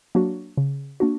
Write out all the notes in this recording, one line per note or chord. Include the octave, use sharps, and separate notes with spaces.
F#3 A#3 D4 F#4
C#3
A#3 D4 F#4